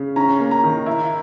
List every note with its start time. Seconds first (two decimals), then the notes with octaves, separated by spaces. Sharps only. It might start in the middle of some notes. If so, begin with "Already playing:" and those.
Already playing: C#3
0.16 C#4 A#5
0.40 A#3
0.51 A#5
0.64 D#3
0.86 E4